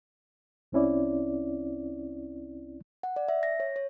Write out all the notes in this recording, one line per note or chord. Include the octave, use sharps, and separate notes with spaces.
C2 C4 C#4 E4 D5
F#5
D5
E5
A#6
C#5
C#5